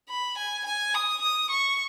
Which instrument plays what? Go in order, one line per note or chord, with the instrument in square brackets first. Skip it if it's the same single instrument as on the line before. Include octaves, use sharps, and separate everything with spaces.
[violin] B5
G#5
G#5
D#6
D#6
C#6